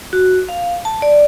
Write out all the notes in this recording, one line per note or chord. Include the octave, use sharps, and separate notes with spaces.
F#4
F5
A5
D5